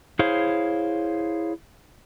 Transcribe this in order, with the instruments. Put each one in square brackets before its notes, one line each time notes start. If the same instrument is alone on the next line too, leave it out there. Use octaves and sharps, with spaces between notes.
[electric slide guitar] E4 G#4 C5 C#5 F5